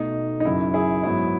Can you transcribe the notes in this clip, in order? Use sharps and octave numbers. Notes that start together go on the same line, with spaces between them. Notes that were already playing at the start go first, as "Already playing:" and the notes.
Already playing: B2 A3 D#4
D#4
F#2 C#3 F#3 E4
E4 G#4
G#2 F#3 B3 E4